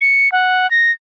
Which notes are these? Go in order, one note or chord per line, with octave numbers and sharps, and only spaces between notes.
C#7
F#5
A#6